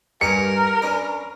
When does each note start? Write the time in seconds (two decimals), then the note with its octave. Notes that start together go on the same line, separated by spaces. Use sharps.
0.21 G2 A#4 G#5 D6 C#7
0.82 C#4 D4 B4